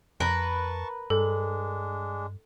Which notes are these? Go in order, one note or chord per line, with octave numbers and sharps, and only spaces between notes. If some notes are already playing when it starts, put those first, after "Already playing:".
F2 A#4 B4 A5 C#6
G2 G#3 D4 A4